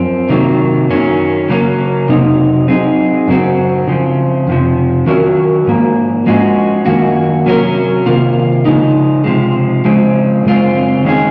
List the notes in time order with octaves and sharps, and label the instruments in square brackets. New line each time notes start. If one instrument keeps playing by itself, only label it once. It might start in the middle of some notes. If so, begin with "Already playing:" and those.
Already playing: [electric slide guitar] F#2 F3 C4
C3 D#3 F#3 A#3
F#2 D#3 F#3 C#4
C#3 F#3 A#3 C#4
F2 C3 F#3 C4 D#4
F#3 C4 D#4 G#4
F#2 C#3 F#3 C4 F#4
C#3 F3 C4
F2 C3 F3
D#3 F#3 C#4 F#4 A#4
G#2 F3 A#3
F3 G#3 C#4 F#4
F#2 D#3 A#3 C#4 F#4
C3 F#3 C#4 F#4 A#4
C3 D#3 A#3 F4
C#3 F3 G#3 D#4
C3 F3 G#3
C#3 F3 G#3 C4
F#2 C#3 G#3 C4 F4
D#3 G#3 C#4 G#4